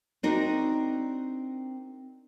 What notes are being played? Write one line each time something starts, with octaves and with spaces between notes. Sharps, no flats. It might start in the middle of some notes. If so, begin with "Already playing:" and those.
C4 D4 D#4 F#4 A#4